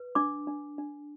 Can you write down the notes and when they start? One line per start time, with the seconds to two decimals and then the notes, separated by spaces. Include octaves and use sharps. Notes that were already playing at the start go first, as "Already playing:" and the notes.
Already playing: B4
0.15 D4 D6
0.47 D4
0.78 D4